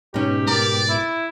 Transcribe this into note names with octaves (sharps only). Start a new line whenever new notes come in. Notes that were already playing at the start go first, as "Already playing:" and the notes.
G#2 B2 C#4 D#4 G4
A#4 D5
E4